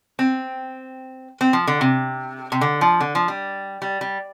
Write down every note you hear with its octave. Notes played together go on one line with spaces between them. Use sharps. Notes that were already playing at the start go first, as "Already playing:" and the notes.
C4
C4
F3
D3
C3
C3
D3
F3
D3
F3
G3
G3
G3